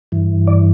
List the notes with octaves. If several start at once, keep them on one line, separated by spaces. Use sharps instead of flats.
G2 E3
D5